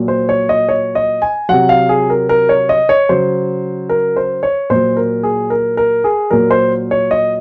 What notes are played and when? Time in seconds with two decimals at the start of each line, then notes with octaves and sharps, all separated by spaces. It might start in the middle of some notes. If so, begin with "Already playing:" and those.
Already playing: A#2 F#3
0.08 C5
0.29 C#5
0.49 D#5
0.69 C#5
0.95 D#5
1.22 G#5
1.49 C3 F#3 F#5
1.69 F5
1.89 G#4
2.10 A#4
2.29 A#4
2.49 C#5
2.69 D#5
2.89 C#5
3.09 C#3 F#3 C5
3.89 A#4
4.16 C5
4.43 C#5
4.70 A#2 F#3 C5
4.97 A#4
5.23 G#4
5.50 A#4
5.77 A#4
6.04 G#4
6.31 A#2 F#3 A#4
6.51 C5
6.91 C#5
7.11 D#5